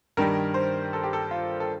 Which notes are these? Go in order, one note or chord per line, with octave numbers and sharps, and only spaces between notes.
G2 D#3 G3 A#4
C5
A4
G4
A4
F4
A4